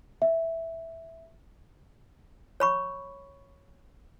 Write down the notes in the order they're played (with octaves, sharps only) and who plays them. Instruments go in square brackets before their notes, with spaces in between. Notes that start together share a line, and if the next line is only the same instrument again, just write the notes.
[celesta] E5
[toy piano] C#5 B5 C#6